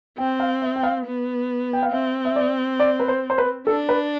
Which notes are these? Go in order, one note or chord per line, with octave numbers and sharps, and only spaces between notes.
C4 G5
F5
E5
G5
F5
B3
G5
F5
C4 E5
E5
D5
D5
B4
C5
C5
B4
D4 A4
B4